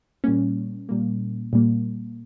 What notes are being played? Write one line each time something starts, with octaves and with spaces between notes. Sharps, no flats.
A#2 G3 A#3 C#4
A#2 G3 A#3
A#2 G3 A#3